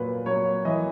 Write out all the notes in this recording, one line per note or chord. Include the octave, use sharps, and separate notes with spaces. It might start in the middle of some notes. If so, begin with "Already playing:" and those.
Already playing: A#2 F#3 B4
F#3 C#5
E3 D#5